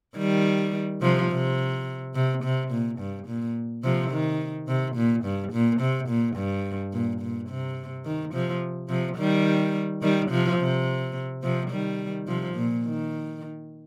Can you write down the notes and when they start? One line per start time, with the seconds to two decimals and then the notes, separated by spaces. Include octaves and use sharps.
0.17 D#3 G3
1.02 C3 F3
1.31 C3
2.15 C3
2.43 C3
2.71 A#2
2.99 G2
3.28 A#2
3.83 C3 F3
4.11 D#3
4.68 C3
4.96 A#2
5.24 G2
5.53 A#2
5.81 C3
6.09 A#2
6.36 G2
6.93 A#2
7.21 A#2
7.49 C3
8.05 D#3
8.33 C3 F3
8.89 C3 F3
9.17 D#3 G3
10.02 D#3 G3
10.30 C3 F3
10.59 C3
11.43 C3 F3
11.71 D#3 G3
12.27 C3 F3
12.55 A#2
12.84 D#3